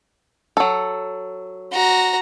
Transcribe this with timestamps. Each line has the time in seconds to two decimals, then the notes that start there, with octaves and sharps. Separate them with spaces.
0.57 F#3 A4
1.72 F#4 A#5